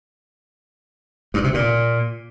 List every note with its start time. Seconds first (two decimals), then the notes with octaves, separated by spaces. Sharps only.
1.34 G2
1.44 C3
1.54 A#2